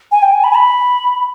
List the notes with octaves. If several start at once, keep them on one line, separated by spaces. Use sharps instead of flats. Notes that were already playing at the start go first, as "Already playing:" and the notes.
G#5
G5
G#5
B5
G#5
B5